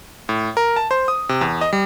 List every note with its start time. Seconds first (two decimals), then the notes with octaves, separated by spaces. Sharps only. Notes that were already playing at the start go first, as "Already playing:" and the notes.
0.29 A2
0.57 A#4
0.76 A5
0.91 C5
1.08 D#6
1.29 C3
1.41 E2
1.61 D#5
1.73 G3